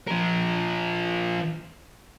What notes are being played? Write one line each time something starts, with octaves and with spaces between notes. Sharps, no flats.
F3 A#4